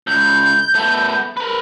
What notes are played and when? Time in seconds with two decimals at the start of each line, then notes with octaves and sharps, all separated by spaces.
0.07 C#2 G6
0.75 A3 B3
1.37 A#4 B4